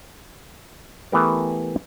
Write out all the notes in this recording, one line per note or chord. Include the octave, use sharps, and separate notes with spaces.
E3 A3 B3 G4 A#4